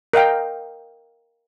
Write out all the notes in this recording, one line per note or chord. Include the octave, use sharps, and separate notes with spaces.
A#4 D#5 F5 G5